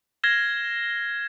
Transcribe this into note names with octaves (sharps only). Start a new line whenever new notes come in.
F6 G#6 A#6 C7 E7 G7